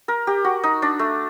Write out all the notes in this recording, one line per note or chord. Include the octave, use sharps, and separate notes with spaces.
A#4
G4
F#4
D#4
D4
A3